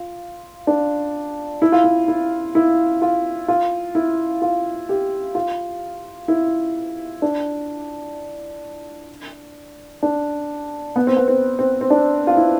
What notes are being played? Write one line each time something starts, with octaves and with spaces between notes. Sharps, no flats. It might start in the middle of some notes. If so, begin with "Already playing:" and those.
Already playing: F4
D4
E4
F4
E4
E4
E4
F4
F4
E4
F4
G4
F4
E4
D4
D4
B3
C4
B3
C4
C4
C4
D4
F4
E4